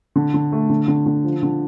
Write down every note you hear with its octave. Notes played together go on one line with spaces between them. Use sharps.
D3
D3
A3
D3
D3
D3
F3
D3